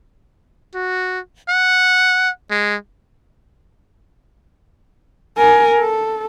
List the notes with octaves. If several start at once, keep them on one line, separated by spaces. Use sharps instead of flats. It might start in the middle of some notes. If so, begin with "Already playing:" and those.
F#4
F#5
G#3
A#4 G#5
A4